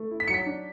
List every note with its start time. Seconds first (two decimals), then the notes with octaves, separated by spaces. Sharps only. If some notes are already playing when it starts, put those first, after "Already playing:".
Already playing: A3
0.11 E4
0.20 B6
0.27 F#3 C#7
0.34 B6
0.46 D4